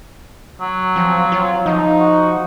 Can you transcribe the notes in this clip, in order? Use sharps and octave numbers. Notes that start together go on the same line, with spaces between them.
F#3
F3 C4
F4 C#5
F3 D#4
F#4